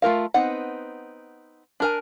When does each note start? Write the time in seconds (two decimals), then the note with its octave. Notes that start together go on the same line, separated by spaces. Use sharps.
0.02 A3 F4 A#4 F5
0.34 B3 C4 D#4 F#5
1.80 D4 A#4 G#5